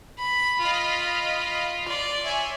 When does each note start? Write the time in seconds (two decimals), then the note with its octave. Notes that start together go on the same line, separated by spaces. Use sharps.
0.18 B5
0.60 F4 D#5 F5 B5
1.88 D5 C6
2.23 C#5 E5 G#5